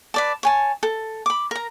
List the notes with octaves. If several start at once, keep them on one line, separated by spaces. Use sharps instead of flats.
B4 D5 A5
C#5 G#5 A5
A4
B5 D6
A#4 A#5